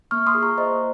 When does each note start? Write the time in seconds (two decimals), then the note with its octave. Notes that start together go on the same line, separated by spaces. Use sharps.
0.11 A#3 C#6 F6
0.26 C6 D#6
0.35 F4 G#4
0.43 A#5 C#6
0.58 A#3 C5 D#5